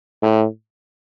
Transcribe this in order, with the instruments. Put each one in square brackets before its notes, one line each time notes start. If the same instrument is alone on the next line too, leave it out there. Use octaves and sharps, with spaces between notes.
[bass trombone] A2